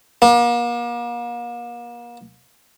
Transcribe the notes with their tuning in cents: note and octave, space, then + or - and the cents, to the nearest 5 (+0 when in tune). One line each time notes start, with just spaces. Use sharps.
A#3 +40